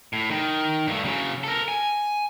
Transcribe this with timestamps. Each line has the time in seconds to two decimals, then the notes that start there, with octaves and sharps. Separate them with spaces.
0.13 A2
0.31 D#3
0.87 G2 A3
1.05 C#3 F#3
1.44 A4 A#4
1.68 G#5